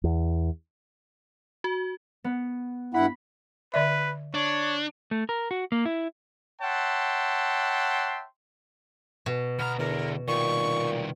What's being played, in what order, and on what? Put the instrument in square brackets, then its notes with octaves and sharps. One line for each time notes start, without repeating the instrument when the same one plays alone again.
[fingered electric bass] E2
[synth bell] F#4
[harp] B3
[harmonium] G2 E4 F#5 [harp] B5
[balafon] D3 D5 E5 [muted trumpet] B4
[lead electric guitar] D4 [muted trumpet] C#5
[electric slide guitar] A3
A#4
F#4
A#3
E4
[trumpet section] C#5 E5 F#5 G5 A5 C6
[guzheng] B2
[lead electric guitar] D2 A#5 [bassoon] B3 [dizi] F6
[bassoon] E2 [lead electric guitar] D3 [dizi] A#4
[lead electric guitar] C2 D#3 [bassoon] A#2 [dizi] C#6